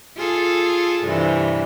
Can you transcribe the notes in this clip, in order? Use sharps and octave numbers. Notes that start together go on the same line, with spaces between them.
F4 G#4 A4
G2 C3 E3